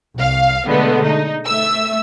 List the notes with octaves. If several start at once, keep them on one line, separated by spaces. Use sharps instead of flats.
C2 F5
B2 D3 G#3 A3 B3
D#4
A3 E5 E6